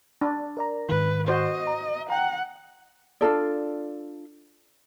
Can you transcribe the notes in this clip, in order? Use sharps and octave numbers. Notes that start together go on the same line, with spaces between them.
D4
A#4 D5 A#5
G#2 D#3 B4
F#4 C5 D#5
A#5
F#5 G5 A#5
D4 F4 A4 D5